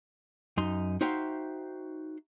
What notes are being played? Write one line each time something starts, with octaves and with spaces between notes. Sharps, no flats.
F#2 D#4 C6
D#4 F#4 C5 E5 F5 G5